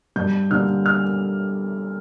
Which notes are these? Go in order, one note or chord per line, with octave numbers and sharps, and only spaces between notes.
G2 G6
D3 G3 A#3 F6
F6